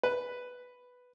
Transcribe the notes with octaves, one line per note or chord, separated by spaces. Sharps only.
B4